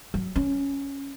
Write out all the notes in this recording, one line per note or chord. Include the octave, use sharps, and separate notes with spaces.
F#3
C#4